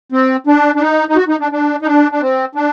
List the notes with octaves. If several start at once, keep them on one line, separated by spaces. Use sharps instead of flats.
C4
D4
D4
D#4
D#4
F#4
D#4
D4
D4
D#4
D4
D4
C4
D4